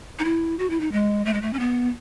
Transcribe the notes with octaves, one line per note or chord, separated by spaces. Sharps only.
D#4
E4
F#4
E4
D#4
G#3
A3
G#3
A3
C#4
B3